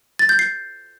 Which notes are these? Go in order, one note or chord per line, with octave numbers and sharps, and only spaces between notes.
A6
G6
C7